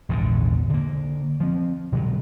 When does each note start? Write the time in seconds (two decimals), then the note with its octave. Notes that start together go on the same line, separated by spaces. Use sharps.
0.09 A#1 E2 G#2 D3
0.70 D3 A#3
1.40 F3 C4
1.92 B2 D3 F#3 G3